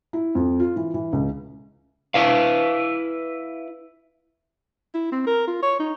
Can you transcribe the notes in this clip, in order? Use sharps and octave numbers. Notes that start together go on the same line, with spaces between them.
E4
F2
F4
E3
E3
C#2
E4 B4 F5
E4
C4
A#4
F4
C#5
D#4